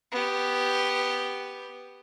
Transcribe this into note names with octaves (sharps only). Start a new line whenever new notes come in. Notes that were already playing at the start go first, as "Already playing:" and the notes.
B3 G4